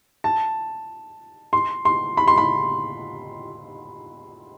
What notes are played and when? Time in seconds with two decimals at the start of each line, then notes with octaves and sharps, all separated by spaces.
0.24 A5
1.53 C6
1.85 C6
2.17 B5
2.28 C6
2.38 B5